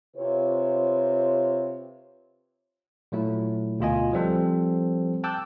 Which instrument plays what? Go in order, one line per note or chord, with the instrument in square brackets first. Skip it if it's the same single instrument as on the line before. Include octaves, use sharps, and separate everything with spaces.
[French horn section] C3 C4 F4 B4 C#5
[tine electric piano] A#2 F#3 A3 E4
D2 B2 F4 D#5 G#5
F3 G3 C4 A4 C5
G5 A5 D6 E6 F#6 G6